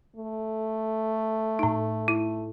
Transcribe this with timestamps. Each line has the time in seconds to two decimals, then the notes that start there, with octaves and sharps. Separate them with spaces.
0.16 A3
1.59 A2 D#4
2.08 E4